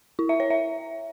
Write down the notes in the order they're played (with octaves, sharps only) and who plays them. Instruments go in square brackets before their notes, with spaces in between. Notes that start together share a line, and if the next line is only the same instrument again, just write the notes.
[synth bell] E4
E5
C#5
E5